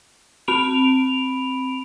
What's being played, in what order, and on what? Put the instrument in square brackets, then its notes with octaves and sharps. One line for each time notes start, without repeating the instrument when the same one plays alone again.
[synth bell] C4 B5 D7 F7